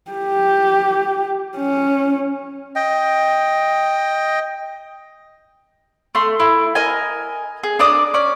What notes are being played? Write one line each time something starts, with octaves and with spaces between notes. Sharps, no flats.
G4
C#4
D#5 G5
A3 C6
E4
A#4 D#5 G#5
G#4
D4 A#4 D5 D#6
C#4 D5